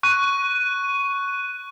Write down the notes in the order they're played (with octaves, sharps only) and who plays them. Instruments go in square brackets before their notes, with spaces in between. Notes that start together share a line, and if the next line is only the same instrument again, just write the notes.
[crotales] C#6 F#6 D#7